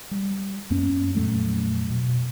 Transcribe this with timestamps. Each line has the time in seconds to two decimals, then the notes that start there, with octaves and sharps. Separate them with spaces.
0.11 G3
0.70 F#2 A#3 B3 C#4
1.15 F2 A#2 F#3 A3
1.90 B2